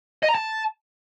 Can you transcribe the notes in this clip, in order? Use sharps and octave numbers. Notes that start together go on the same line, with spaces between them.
D#5
A#5
A5